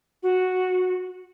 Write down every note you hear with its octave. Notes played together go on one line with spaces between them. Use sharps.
F#4